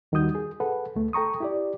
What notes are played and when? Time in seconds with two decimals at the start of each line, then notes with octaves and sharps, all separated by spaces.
0.12 D#2 D#3 G3 F#4 D#6 G6
0.35 G#4
0.60 G#4 A4 B4 F#5
0.96 D2 A3
1.13 A4 G5 A#5 C#6 D#6
1.40 E4 G4 D5